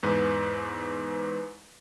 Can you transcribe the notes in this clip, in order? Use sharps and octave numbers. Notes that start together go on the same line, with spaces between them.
E2 G#2 B4